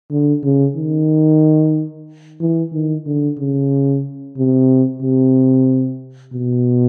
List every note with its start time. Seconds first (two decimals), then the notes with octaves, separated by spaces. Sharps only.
0.11 D3
0.44 C#3
0.76 D#3
2.41 E3
2.73 D#3
3.06 D3
3.39 C#3
4.38 C3
5.02 C3
6.33 B2